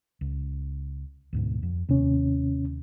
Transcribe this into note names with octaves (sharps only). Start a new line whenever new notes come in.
C#2
D2 G#2 B2
F2
D#2 C3 C#4